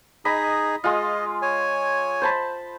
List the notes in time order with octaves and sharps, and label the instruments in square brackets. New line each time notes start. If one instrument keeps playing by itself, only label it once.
[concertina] D#4 G#4 [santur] D#5 B5
[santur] G#3 F4 [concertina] D#5
[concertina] C#5 G#5
[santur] C5 A5 B5